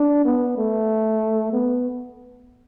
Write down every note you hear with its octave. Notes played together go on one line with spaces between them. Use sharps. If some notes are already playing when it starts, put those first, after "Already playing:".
Already playing: D4
B3
A3
B3